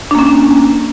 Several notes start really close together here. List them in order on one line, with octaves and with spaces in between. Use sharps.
D4 A#3 C#4